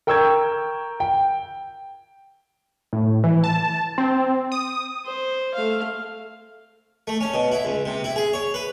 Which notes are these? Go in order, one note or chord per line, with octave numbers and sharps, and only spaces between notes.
A#4 G5 C#6 E6 G6 G#6
G5
A2
E3
A5
C4
D#6
C5
A3 F5
A3
C#4
B2
E4
C#2
C3
E4
G#4
C#5
B4